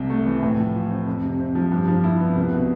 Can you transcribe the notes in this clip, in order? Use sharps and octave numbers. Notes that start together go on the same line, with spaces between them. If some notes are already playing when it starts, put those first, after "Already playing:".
Already playing: C2 C3
A3
E3
A2
F3
F4
C4
F2
C3
C4
F3
G2
F3
E4
B3
C2
B2